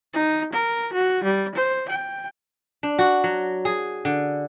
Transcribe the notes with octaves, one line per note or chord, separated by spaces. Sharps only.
D#4
A#4
F#4
G3
C5
G5
D4
F#4
F#3
G#4
D3